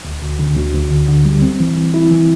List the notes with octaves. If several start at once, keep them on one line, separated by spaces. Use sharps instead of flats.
D2
D2
D3
D2
D2
D3
D3
G3
C4
E3
E3
E4
E3